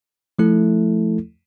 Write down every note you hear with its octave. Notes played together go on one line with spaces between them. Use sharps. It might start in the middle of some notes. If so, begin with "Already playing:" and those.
F3 A3 E4 A4